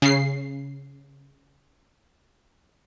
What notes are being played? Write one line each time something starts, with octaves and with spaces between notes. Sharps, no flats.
C#3 C7